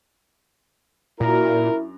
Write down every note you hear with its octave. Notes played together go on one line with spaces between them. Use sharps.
F#2 A#2 D4 E4 A#4 A#5